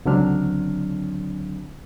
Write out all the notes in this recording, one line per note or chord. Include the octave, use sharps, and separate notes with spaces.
C#2 D3 F#3 C4 D4 F6